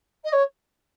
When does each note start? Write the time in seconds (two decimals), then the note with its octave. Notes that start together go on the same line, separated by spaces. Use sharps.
0.24 D#5
0.32 C#5